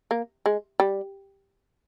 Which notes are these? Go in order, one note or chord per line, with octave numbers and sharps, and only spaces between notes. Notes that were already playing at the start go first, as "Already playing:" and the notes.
A#3
G#3
G3